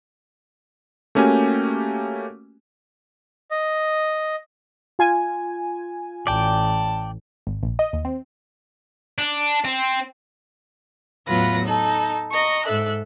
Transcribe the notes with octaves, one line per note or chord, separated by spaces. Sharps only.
A3 A#3 C#4 F#4 G4 G#5
D#5
F4 G#5
A1 D5 G5 A5
G#1
A#1
D#5
D#2
C4
D4
C4
E2 A2 F#3 F4 B4 A#6
D#4 A4
D#5 A#5 C#6
G#2 A4 E5 F#6